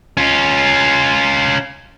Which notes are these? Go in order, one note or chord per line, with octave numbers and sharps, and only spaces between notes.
C#4 F4